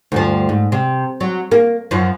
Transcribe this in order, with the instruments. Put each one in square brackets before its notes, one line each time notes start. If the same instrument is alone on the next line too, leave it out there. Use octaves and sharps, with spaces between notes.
[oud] D2 G2 F3
G#2
C3
F#3
A#3
F#2 F3